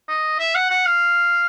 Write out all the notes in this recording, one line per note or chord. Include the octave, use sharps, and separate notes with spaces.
D#5
E5
F#5
F#5
F5